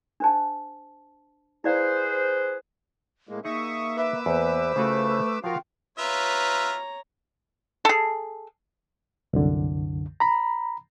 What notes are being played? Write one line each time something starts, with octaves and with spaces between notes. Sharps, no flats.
D4 C5 A5
E4 G#4 B4 C5 D5 F5
A2 G#3 A#3
A#3 D#4 G#4 E5 C#6 D#6
B4 E5 D6 E6
E2 C5
C#3 A3 F4 F#4
F3 F4 F#4 A#4 F5 G5
F4 B4 C#5 E5 A#5
G#4 A4
C2 F#2 D3
A#5 B5